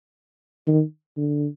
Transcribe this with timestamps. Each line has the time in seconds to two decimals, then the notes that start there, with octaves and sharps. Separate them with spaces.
0.67 D#3
1.17 D3